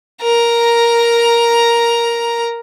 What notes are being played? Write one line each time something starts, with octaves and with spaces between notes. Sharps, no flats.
A#4 A#5